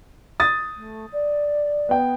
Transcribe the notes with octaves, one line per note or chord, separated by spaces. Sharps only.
D#6 A6
A3
D5
B3 G5